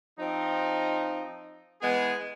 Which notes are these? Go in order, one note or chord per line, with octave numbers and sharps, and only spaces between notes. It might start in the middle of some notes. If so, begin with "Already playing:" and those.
F3 C4 D#4
E3 G#3 B3 G#4